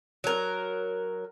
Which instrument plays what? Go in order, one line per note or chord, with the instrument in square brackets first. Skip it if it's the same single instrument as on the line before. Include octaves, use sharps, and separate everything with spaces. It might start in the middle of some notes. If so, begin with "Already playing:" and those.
[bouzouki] F#3 A#4